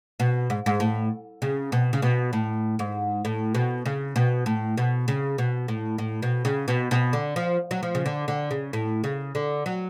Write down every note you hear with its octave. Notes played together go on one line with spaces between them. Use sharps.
B2
G#2
G#2
A2
C#3
B2
C#3
B2
A2
G#2
A2
B2
C#3
B2
A2
B2
C#3
B2
A2
A2
B2
C#3
B2
B2
D3
F3
F#3
F3
C#3
D3
D3
C#3
A2
C#3
D3
F#3